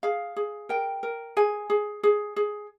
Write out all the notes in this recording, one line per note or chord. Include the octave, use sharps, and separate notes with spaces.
G#4 F5
G#4
A#4 G5
A#4
G#4 G#5
G#4
G#4
G#4